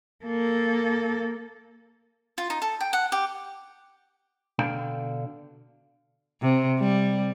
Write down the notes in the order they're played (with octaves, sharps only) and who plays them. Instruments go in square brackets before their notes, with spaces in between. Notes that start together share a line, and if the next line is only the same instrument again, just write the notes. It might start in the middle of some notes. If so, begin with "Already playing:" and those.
[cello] A#3 A4
[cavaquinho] F4
D#4
A4
G5
F#5
G4
[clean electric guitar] B2 D3 D4 F5 G5
[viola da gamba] C3
G3